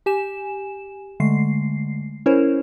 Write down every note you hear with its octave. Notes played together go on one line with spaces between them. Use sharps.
G4 G#5 E7
D3 G#3 A3 C7
C#4 E4 A#4 C5 C#5